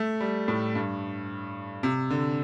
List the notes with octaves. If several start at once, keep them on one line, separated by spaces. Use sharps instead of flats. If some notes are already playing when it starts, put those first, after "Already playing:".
Already playing: A3
G3
A2
G2
C3
D3